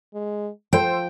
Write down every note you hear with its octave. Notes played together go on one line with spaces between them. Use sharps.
G#3
F3 A4 C5 G5